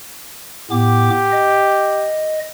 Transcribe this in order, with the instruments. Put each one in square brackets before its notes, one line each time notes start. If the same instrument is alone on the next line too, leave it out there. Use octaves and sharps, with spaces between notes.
[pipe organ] A2 B3 D6 [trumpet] G4
[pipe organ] D#5